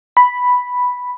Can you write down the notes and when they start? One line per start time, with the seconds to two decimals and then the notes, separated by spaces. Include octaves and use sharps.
0.17 B5